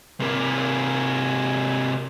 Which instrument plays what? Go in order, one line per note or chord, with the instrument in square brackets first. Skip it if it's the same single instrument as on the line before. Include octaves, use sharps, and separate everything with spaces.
[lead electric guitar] C3 A#3